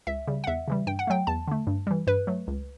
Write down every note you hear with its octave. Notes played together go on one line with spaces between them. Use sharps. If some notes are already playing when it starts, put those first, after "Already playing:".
C#2 E5
C#3 G3
F#5
E2 E5
C#3 E3 G3
G2 G5
F#5
F#3 A3 G5
E2 A5
D3 A3
G2
E3 G3
G2 B4
F#3 A3
C#2